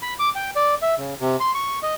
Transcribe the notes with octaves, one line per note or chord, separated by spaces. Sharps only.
B5
D6
G5
D5
E5
C#3
C3
C6
C#6
D#5